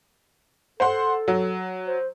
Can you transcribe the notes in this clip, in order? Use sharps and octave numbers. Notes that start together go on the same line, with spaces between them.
A4 C5 F#5 C6
F#3
C5